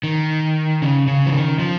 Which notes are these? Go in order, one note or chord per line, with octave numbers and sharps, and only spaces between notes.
D#3
C#3
C#3
F3
D#3
F3